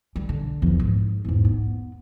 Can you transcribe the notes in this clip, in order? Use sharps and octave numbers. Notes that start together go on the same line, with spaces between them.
G3
D3
E2 F3
G#2
E2 G#2
B3